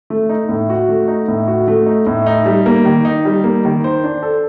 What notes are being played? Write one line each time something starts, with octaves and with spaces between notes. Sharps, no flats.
A3
D#4
A2
F#4
A3
D#4
A2
F#4
A3
D#4
A2
D#4
G3
A#3
D#3
D#4
G3
A#3
D#3
C5
D4
A4